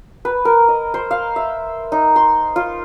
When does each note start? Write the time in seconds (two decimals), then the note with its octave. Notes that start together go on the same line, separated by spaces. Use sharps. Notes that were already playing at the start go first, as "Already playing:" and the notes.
0.25 B4
0.45 A#4
0.68 D#5
0.94 C5
1.11 F5
1.36 E5
1.92 D#4
2.16 C6
2.56 F4